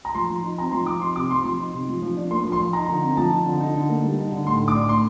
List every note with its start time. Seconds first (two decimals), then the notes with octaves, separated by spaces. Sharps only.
0.05 A#5
0.15 F3 C6
0.29 F3
0.44 D#4
0.58 C4 A#5
0.72 F3 C6
0.86 F3 D6
1.01 D#4 C6
1.16 C3 D6
1.30 C4 C6
1.44 F3 C6
1.59 D#4
1.73 C3
1.88 F3
2.02 F3
2.17 D4
2.31 A#3 C6
2.44 F3
2.52 C6
2.60 F3
2.73 D#4 A#5
2.88 D3
3.02 C4
3.17 F3 A5
3.32 D#4
3.45 D3
3.60 D#4
3.74 D3
3.89 A#3
4.04 G3
4.18 D#4
4.32 D3
4.46 A2 C6
4.60 A2
4.68 D6
4.75 D4
4.89 A3 C6